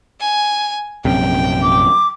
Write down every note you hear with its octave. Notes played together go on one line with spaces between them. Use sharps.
G#5
A#1 F#2 C3 G5
D6